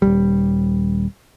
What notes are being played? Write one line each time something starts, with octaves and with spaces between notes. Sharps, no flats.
D#1 D#2 G3